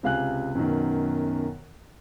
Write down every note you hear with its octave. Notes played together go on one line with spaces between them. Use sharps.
C#2 C3 F5 G#5 F#6
F#2 B2 D#3